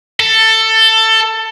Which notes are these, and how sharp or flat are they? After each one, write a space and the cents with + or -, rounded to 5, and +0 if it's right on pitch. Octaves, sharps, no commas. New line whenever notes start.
A4 +15